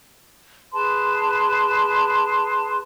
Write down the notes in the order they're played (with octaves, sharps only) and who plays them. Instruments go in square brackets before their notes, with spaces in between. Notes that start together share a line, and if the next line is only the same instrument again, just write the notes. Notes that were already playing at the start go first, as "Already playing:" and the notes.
[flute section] G#4 B4 A5 C6